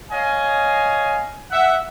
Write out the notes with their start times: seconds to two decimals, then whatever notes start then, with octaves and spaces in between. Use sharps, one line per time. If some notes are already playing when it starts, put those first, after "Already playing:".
0.11 C#5 D#5 F5 G#5
1.51 E5 F#5